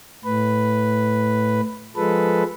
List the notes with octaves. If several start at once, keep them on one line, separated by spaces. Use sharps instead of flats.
A2 B4
F3 G#3 A4 B4